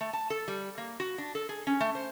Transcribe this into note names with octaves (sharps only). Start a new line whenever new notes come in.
A3
A5
A4
G3
A#3
F#4
D4
A4
G#4
C#4
A3
C5